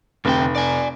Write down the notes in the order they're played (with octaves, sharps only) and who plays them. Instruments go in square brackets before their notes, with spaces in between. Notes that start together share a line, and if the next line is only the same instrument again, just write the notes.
[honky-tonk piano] F1 [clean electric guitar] D2 C3 G5
[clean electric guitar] D5 G#5